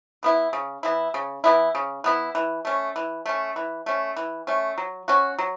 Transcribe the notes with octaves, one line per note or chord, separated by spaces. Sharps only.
E3 B3 E4
C#3
E3 B3 E4
C#3
E3 B3 E4
C#3
E3 B3 E4
E3
A3 C#4
E3
A3 C#4
E3
A3 C#4
E3
A3 C#4
F#3
C#4 F#4
F#3